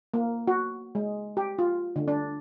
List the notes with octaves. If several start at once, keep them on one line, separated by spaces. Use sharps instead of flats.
A#3
F#4
G#3
G4
F4
D3
D4